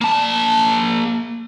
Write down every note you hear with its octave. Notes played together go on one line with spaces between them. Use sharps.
A#3 A5